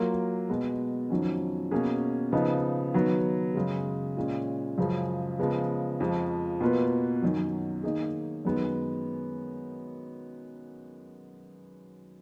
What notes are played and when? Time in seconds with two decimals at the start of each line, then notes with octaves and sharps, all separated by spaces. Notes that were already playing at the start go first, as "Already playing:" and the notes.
Already playing: F#3 A#3 F4 A#4
0.49 B2 G#3 B3
1.10 F2 D#3 F#3 C#4
1.71 B2 A#3 C#4 G#4
2.32 C#3 F3 B3 D#4
2.94 D#3 F#3 B3
3.55 F#2 C#3 G#3
4.17 A#2 G#3 C#4
4.78 F#2 C#3 F3 G#3
5.39 C#3 F3 G#3 B3
6.00 F2 F3 G#3
6.61 B2 A#3 F4 B4
7.22 F#2 D#3 F#3
7.83 D#3 A#3 D#4 G#4
8.45 F#2 D#3 G#3 B3